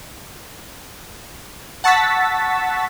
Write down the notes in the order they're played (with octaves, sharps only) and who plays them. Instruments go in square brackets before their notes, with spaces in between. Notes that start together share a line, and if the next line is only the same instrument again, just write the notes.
[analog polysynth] F#5 A5 C#6 E6 A6 B6